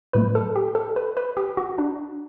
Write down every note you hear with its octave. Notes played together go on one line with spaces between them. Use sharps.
A2 F#3 A3 B4
A4
G4
A4
B4
B4
G4
F#4
D4